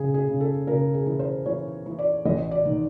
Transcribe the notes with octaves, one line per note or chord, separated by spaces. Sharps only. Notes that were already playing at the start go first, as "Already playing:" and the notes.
Already playing: C#3 G#4
G#4
C#3
A4
C#3 A#4
G#4
E3
C5
E3 C#5
E3
D5
A1 D#5
D5
D#3